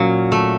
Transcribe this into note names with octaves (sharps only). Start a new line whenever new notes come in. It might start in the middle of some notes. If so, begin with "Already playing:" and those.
Already playing: A#2 F#3 C#4
A3